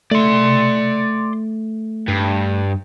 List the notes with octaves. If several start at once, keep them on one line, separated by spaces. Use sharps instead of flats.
A3 D5 C6
G2